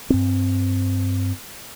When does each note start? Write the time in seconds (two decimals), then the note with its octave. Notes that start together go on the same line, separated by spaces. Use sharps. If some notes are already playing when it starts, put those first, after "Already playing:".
0.10 G2 C4